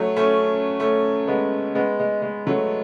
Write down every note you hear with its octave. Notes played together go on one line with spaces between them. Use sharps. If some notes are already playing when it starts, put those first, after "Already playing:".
Already playing: F#3 A3
A3 C#4
A3 C#4
G#3 B3
G#3 B3
G#3
G#3
F#3 A3